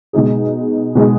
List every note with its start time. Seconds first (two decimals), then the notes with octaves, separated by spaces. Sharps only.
0.13 B2 G#3 D#4 G#4
0.95 B2 G#3 D#4 G#4